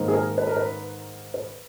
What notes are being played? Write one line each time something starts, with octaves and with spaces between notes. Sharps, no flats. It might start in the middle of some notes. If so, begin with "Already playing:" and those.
Already playing: G#2 D#3 A#3
G#4
A#4
B4
A#4
B4
B4